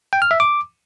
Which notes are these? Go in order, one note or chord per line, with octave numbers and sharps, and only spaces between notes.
G5
F6
E5
D6